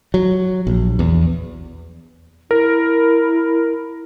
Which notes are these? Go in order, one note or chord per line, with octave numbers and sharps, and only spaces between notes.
F#3
A#1
E2
E4 A#4